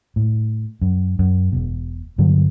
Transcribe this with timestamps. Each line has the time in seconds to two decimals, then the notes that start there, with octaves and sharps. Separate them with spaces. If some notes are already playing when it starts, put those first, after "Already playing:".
0.16 A2
0.82 F#2
1.19 F#2
1.52 E1 B2
2.18 G2 D3 F#3